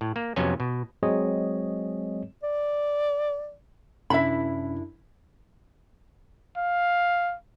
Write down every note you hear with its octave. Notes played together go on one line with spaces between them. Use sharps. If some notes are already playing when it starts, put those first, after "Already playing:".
A2
A#3
F2 C3 F#3 B3 C#4 G#5
B2
F#3 G#3 C4 G#4 C#5 D#5
D5
F#2 C3 C#4 D4 E4 E5 B5
F5